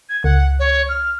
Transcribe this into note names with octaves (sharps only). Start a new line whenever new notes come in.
G#6
C#2 F#5
C#5
F6